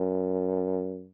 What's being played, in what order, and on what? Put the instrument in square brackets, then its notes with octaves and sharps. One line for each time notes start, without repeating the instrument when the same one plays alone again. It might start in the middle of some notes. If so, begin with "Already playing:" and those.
Already playing: [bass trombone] F#2